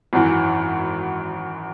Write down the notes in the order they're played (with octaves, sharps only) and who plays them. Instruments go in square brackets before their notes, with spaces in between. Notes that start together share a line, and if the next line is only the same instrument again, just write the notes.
[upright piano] G#1 F#2 E3